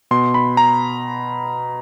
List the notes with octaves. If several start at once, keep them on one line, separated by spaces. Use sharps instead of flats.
B2 C6
B5
A#5